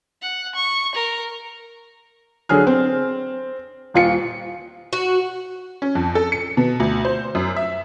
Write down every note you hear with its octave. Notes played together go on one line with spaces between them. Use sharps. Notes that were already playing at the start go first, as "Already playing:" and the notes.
F#5
C#6
A#4
D3 F#3 G#4 F6
C4
D#1 F4 C#7
F#4
C#4
F2
A4
C#7
B2
D2
C5
F#2
E5